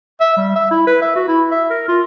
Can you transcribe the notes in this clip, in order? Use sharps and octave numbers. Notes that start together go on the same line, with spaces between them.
E5
G3
E5
E4
B4
E5
F#4
E4
E5
A#4
F4